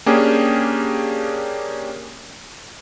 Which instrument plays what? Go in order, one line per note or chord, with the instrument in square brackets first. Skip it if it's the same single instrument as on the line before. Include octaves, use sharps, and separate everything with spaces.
[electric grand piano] A#3 C#4 D4 G4 G#4